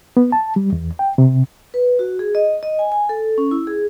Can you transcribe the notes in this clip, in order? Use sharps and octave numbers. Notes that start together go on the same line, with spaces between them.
B3
A5
G3
E2
G5
C3
B4
F#4
G#4
D#5
D#5
G#5
G#5
A4
C#4
E4
G#4